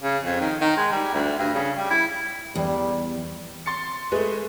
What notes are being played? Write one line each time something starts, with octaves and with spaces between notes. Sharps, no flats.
C#3
F2
D#3
D#3
G#3
G3
D2
G2
C#3
G3
E4
E2 G3
C6 A6 C#7
G#3 A3 G#4 B4 E5